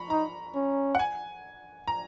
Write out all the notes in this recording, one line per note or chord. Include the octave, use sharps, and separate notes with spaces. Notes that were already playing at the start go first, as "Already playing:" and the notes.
Already playing: A#5 B5 C#6
D#4 A#5
C#4
F#5
G#5
A#5